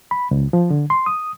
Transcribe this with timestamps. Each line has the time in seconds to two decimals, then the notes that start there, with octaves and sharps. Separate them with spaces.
0.11 B5
0.31 C#2
0.53 F3
0.70 D3
0.90 C6
1.06 D#6